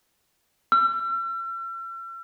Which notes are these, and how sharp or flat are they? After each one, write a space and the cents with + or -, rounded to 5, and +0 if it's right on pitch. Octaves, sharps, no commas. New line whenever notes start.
E6 +45